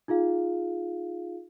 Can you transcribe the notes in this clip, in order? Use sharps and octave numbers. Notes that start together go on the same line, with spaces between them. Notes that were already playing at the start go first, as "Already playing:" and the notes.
D#4 F4 G#4 F5